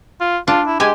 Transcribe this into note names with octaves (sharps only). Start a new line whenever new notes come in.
F4
D4 F4
E4
G#3 G4 G#5